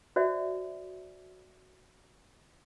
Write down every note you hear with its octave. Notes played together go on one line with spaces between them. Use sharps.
F#4 C5 D5 E5